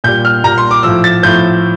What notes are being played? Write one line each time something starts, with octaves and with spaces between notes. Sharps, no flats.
A#2 G3 G6
F6
A#2 G3 A#5
C6
D6
A2 F3 E6
A6
A2 F3 G6